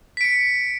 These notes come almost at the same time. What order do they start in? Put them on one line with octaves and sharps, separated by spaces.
B6 D7 C#7